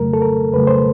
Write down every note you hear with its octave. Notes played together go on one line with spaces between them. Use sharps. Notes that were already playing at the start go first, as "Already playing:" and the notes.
Already playing: F2 C#3 F#3 A3 A#4
A4
A#4
F2 C#3 F#3 A3 B4
C5